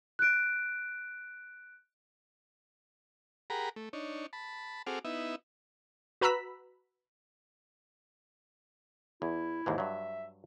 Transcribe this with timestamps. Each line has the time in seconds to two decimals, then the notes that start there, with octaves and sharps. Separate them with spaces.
0.19 F#6 D7
3.50 G4 G#4 A#4 F#5 A#5 B5
3.76 A3
3.93 D4 D#4 C#5
4.33 A5 B5
4.87 C4 F#4 G#4 A4 D6 F6
5.05 B3 D#4 E4 E5
6.21 F#4 B4 A#5 B5 E6 B6
9.22 E2 E4
9.66 D#2 G#2 E3
9.78 G2 F#3 E5